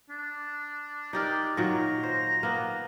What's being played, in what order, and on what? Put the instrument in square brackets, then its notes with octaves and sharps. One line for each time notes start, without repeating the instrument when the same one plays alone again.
[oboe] D4
[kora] D#4 G4 A#4 [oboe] D5
[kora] A#2 D#3 F#3 [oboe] A#5
[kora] C5
A#3 B3